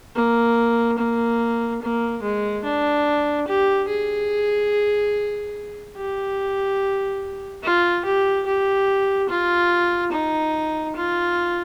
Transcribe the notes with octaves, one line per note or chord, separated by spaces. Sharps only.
A#3
A#3
A#3
G#3
D4
G4
G#4
G4
F4
G4
G4
F4
D#4
F4